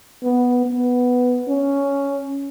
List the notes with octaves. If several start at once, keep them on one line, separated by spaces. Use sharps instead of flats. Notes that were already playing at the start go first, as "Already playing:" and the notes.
B3
B3
C#4